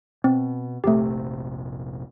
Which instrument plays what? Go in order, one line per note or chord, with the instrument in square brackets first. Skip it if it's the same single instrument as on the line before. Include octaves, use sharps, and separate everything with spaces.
[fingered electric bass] B2 [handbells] C4
[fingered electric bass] F1 A#1 C3 [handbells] A3 G4